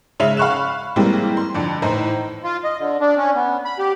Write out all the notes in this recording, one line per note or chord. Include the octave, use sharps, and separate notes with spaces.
C#3 G#3 E5 F7
F5 B5 C#6 F#6 E7
E3 G3 G#3 A#3 C4
C6
F2 D3
A2 E3 D#4 C5 A#5
F4
D#5
D3
D4
C#4
B3
B5
G4